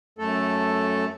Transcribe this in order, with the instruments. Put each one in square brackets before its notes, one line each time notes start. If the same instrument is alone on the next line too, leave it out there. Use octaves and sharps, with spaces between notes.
[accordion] F#2 A3 A4